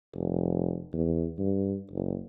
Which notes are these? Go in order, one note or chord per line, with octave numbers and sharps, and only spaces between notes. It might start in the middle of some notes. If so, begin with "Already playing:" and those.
F1
E2
G2
F#1